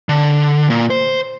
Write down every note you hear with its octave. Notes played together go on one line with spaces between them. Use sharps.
D3
A#2
C5